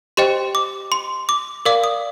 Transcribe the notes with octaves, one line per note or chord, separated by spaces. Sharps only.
G4 C5 D#5 G5 C6
D6
C6
D6
A#4 D5 F5 D6
D#6